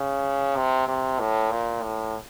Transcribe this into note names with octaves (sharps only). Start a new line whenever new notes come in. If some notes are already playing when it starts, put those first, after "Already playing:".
Already playing: C#3
C3
C3
A2
A#2
A2